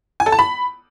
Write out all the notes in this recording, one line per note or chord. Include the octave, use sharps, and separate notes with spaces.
G#5
A4
A5
B5